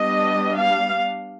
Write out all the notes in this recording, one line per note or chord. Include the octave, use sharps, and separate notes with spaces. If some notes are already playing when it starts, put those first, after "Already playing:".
Already playing: G3 B3 D4 D#5
F5